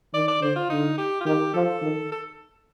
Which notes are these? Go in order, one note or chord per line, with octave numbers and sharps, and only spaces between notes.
D#3 D5
D5
D3 C5
F4
D3 D#4
G4
F4
D#3 G4
F3 A4
D#3
A4